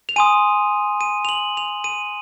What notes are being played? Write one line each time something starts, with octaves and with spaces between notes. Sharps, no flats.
F7
G#5 C6 D#6 D#7
D#7
F7
F#7
F7
D#7